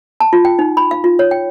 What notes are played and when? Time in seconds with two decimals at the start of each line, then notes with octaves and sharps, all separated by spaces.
0.20 A5
0.33 F4
0.45 G5
0.59 D#4
0.77 B5
0.91 F5
1.04 F4
1.19 C#5
1.31 G5